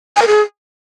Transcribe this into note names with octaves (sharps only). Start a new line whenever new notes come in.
G#5
A#4
G#4